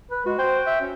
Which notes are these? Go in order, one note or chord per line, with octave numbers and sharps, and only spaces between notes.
B4
G#3 F#4
C5 G5
E5
C#4